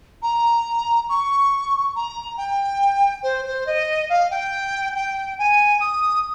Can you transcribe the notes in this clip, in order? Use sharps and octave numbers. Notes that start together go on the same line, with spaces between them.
A#5
C#6
A#5
G5
C5
C5
D#5
F5
G5
G5
G#5
D#6